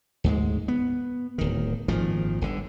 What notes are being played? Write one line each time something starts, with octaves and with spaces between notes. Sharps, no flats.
D2 G#2 G#3
B3
D1 D#3
G#1 A#2 D#3 F3
G1 D3